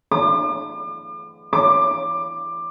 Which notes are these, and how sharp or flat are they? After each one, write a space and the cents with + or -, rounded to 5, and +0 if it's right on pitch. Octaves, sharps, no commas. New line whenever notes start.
D6 +40
D6 +15